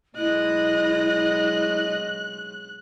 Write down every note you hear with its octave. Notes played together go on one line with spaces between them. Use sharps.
B2 F#3 G#3 E4 D#5 F#6